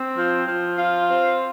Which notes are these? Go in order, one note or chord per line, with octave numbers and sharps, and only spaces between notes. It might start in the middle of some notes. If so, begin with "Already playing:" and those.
Already playing: C4
F3
F3
F4
C4